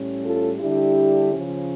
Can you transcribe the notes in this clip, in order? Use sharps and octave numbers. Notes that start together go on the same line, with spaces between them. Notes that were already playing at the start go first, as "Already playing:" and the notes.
Already playing: A2 G3 C#4
F4 A4
D3 G3 D4 E4 G4
C#3 F3 C#4